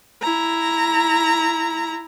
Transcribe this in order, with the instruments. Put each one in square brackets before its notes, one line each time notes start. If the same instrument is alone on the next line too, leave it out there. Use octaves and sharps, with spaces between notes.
[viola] E4 A#5